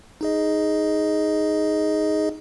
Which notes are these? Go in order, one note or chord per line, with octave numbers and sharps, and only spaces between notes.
D#4 G#4 D#5